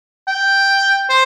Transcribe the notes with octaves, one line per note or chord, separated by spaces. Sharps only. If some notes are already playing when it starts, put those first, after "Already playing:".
G5
C5